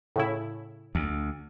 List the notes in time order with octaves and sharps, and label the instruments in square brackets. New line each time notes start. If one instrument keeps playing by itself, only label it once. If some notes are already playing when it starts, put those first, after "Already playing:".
[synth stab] A2 C#3 E4
[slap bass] D2